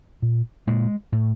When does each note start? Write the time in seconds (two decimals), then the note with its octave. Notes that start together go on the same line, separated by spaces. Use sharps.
0.22 A#2
0.67 A#2 G#3
1.12 A2